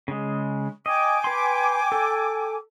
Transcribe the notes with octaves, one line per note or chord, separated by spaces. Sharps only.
C#3 G#3
D#5 G5 G#5 D6
B4 C6
A4